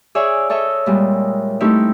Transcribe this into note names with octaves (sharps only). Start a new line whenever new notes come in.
G#4 C#5 D5 E5 G#5 D#6
A4 C#5 D#5 E5
A#2 G3 G#3
A3 C4 C#4 D#4 E4 G4